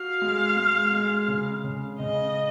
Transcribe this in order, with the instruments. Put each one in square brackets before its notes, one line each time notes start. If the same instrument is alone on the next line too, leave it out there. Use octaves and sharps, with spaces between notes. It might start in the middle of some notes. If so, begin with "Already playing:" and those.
Already playing: [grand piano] F#4 [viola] F5
[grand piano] G#3
G#3
G#3
C#3
C#3
[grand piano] C#3 [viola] D#5